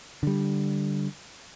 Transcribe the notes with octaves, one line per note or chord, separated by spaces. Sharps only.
D3 G3